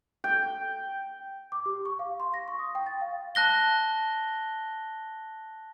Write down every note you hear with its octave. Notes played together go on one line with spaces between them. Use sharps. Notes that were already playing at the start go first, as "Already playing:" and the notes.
G5
D6
G4
C#6
F5
C6
A#6
C#6
D#6
G5
A6
F5
A5 F#6 A#6 G7